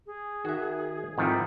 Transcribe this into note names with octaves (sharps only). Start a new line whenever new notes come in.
G#4
D#3 F#4 E5
F2 G#2 D#3 G3 E4